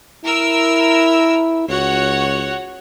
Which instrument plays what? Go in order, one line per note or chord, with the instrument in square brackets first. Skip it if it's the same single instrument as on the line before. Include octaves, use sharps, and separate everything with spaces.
[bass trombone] E4 [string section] A#4 E6
[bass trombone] C#2 [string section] F#4 C#5 F#5